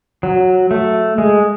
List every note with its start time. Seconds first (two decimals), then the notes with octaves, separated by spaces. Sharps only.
0.23 F#3
0.71 A3
1.18 G#3